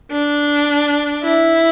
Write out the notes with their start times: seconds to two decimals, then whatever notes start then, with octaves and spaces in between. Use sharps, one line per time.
0.12 D4
1.23 E4